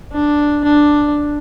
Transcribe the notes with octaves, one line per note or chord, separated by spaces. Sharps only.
D4
D4